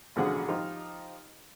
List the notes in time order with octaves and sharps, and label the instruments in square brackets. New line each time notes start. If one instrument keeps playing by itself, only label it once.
[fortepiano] A1 B2 D3 F3 G#4 F#5
F3 D#4 F4 G4